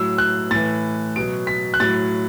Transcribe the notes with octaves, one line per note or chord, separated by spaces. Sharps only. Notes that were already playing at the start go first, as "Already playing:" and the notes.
Already playing: A2 F#3 E6
F#6
A2 E3 A6
B2 F#3 D7
B6
F#6
A2 F#3 A6